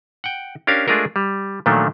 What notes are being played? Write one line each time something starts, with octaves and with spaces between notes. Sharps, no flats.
F#5 G5
C#4 D4 G4 A#4 F5
G#3 A3 D4 F4 G#4 A#4
G3
A#2 D#3 F3 F#3 A3 D4